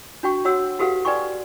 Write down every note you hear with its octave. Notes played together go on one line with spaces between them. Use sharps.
D4 F#4 G5 C#6
F#4 C#5 F#5 C6 E6
F#4 G4 A4 B4 F5 F#5
B4 D5 G5 G#5 C6 C#6